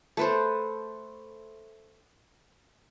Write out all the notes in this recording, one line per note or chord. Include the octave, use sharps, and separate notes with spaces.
A3 B4 C5